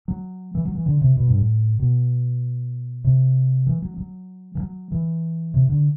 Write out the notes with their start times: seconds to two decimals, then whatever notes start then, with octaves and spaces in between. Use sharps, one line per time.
0.08 F#3
0.55 E3
0.65 F#3
0.75 E3
0.86 D3
1.01 C3
1.17 B2
1.28 G2
1.38 A2
1.79 B2
3.04 C3
3.66 E3
3.82 F#3
3.98 F#3
4.55 E3
4.60 F#3
4.92 E3
5.54 C3
5.69 D3